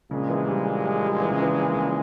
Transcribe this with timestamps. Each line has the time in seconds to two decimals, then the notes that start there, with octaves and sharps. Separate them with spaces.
0.11 A#1 A#2 C#3 G#3
0.30 E3
0.47 G3
0.84 G3
1.03 G3
1.21 E3
1.31 C#3
1.42 E3
1.74 C#3